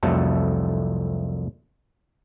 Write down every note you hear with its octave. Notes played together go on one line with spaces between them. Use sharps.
C2 F2 F#3 A3 A4